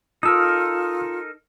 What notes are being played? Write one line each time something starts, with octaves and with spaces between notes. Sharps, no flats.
D#4 F4 A4 A#4 D#6 E6